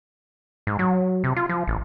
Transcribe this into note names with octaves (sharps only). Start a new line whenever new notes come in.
G#2
F#3
C3
F4
F3
A1